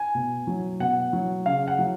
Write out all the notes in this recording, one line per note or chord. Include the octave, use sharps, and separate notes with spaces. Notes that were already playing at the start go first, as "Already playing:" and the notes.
Already playing: G#5
B2
F#3
B2 F#5
F#3
C#3 F5
F#5
F#3